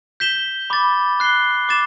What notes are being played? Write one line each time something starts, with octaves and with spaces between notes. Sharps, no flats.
G6 B6 E7 G7
B5 D6 A6
F#6 C7 G7
D6 A6 E7